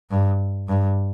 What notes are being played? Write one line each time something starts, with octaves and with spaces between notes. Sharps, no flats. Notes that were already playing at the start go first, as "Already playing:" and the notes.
G2
G2